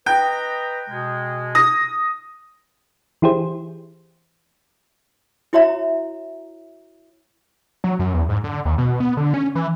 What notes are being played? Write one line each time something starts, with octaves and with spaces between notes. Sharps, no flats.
B4 D#5 G5 A#5
B2 G#3
D#6 A#6
E3 E4 G4 G#4 C5
E4 F#4 C#5 E5 A#5
F#3
F#2
E2
G#2
D3
D#2
B2
B3
D3
C#4
E3